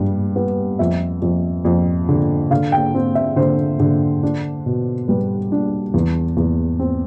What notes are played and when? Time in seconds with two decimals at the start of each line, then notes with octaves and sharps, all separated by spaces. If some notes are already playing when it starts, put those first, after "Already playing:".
Already playing: G2 G3
0.36 B3
0.79 F2 E5
1.22 F2
1.65 F2
2.09 D3
2.51 D3 F5
2.72 G5
2.94 C4
3.15 E5
3.36 D3 C5
3.80 D3
4.23 D4
4.66 B2
5.08 G3 B4
5.52 D4
5.94 E2
6.37 E2
6.79 C4